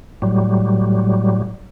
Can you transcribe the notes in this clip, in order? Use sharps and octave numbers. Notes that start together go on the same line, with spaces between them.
A2 F#3 G3